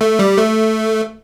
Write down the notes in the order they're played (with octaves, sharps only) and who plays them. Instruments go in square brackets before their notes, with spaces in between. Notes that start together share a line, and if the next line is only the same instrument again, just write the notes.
[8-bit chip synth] A3
G3
A3